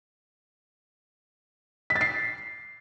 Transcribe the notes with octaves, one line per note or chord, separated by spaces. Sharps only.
B6
A6
C7